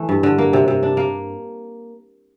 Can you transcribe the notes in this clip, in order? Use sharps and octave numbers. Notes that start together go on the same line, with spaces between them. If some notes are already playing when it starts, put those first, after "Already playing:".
Already playing: E3 A3
G2
D3
A#3
C3
C3
D4
A#3